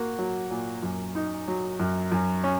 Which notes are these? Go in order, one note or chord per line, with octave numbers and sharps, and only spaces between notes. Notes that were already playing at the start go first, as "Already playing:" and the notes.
Already playing: A#3 F#4
F#3
A#2
F#2
D#4
F#3
F#2
F#2
C#4